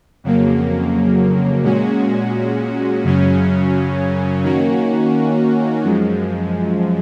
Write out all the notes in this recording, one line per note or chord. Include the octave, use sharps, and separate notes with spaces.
F2 C#3 F#3 A#3
A#2 G#3 C#4 F#4
F#2 C#3 F#3 C#4
D#3 A#3 C#4 F#4
F#2 F3 G#3